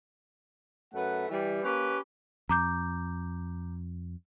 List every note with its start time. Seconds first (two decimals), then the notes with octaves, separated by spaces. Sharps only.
0.94 F#2 A3 B4 F#5
1.30 E3 G3
1.64 A#3 C#4 G4 B4
2.49 F2 A#5 D6 G6